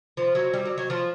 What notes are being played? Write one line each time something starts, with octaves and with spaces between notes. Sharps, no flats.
F3
F#3
G3
F#3
F#3
F3